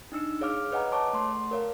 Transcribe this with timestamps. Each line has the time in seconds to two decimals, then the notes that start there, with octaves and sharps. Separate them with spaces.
0.12 D4 D#4 E6 C#7
0.41 G#4 C#5 F5 D6 F6
0.72 B4 C#5 D#5 F#5 G#5 A#5
0.92 C#5 A5 C#6 D6
1.13 A3 C6
1.51 A#4 C#5 F5